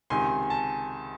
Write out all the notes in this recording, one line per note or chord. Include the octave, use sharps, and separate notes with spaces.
C#2 C3 D#3 G#5 C6
A5